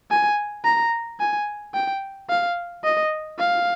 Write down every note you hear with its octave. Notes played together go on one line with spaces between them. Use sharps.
G#5
A#5
G#5
G5
F5
D#5
F5